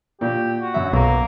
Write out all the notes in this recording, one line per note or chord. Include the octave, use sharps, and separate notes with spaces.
A#2 G4
F#4
F#2 E5
B1 A#3